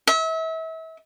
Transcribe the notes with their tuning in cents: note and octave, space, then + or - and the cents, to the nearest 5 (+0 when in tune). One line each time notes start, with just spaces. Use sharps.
E5 -35